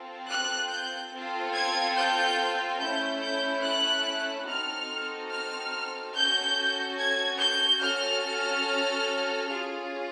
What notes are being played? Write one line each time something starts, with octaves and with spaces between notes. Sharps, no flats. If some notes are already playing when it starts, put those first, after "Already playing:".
Already playing: C4 F4 A4
F#6
G6
C4 F4 A4
G#6
G6
A3 C#4 E4 A4 G6
G6
F#6
C4 D#4 F#4 A4 F6
F6
C#4 F#4 A4 G6
G#6
G6
C#4 F#4 A4 F6
C#4 F4 G#4